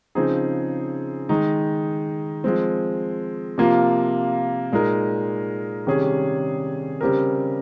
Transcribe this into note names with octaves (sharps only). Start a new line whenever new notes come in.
C#3 F3 C4 D#4 G#4
D#3 G#3 D#4
F3 G#3 C4
C3 F3 A#3 F4
A#2 G#3 D#4 A#4
C3 D#3 G3 C#4 G#4
C#3 G3 C4 G4 A#4